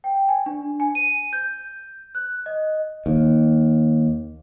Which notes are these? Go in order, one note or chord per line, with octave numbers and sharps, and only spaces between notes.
G5
G#5
D4
G#5
D#7
G6
F#6
D#5
D#2